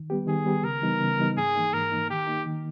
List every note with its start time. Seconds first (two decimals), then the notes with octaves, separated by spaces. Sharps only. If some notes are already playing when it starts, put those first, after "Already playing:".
Already playing: D#3
0.10 G3 B3 G4
0.27 D#3 G#4
0.46 G3 B3 G4
0.63 C#3 A#4
0.82 E3 G3 B3 D#4
1.00 C#3
1.18 E3 G3 B3 D#4
1.37 G#2 G#4
1.55 E3 A#3 D#4
1.73 G#2 A#4
1.91 E3 A#3 D#4
2.09 D#3 G4
2.27 A#3 D#4
2.46 D#3